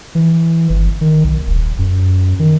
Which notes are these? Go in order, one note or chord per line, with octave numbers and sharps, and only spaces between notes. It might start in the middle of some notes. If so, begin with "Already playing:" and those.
E3
G1
D#3
B1
D#1
F#2
D#3